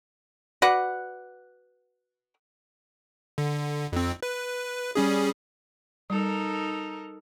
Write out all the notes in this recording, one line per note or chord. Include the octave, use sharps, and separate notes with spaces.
F#4 B4 D5 F#5
D3
F2 C4
B4
G3 C#4 G#4
G3 D#4 A4 A#4